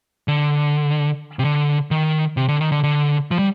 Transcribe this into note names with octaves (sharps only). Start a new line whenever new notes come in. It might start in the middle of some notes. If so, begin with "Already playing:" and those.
D3
C3
D3
D#3
C3
D3
D#3
D3
D3
F3
G3